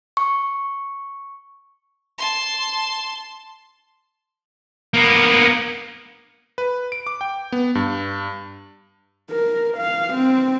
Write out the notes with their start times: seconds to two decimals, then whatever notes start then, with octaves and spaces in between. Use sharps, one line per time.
0.17 C#6
2.18 A5 C6
4.94 A#3 B3
6.58 B4
6.92 D7
7.07 D6
7.21 G5
7.52 B3
7.75 G2
9.31 A#4
9.78 F5
10.14 C4